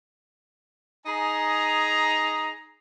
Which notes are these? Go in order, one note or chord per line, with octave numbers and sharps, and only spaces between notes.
D#4 G#4 G#5 A#5